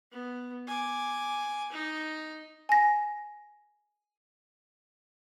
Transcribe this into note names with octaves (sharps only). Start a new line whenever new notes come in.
B3
G#5 D6
D#4
G#5 A#6